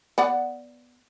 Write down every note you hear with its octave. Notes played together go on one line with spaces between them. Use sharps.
B3 D5 F#5